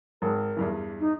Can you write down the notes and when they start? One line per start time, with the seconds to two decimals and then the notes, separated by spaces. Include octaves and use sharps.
0.22 G#1 A#4
0.57 E2 G2 E3
0.99 D#4